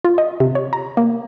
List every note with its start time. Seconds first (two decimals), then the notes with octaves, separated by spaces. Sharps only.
0.05 F4
0.18 D#5
0.40 C3
0.55 C#5
0.73 A#5
0.97 A#3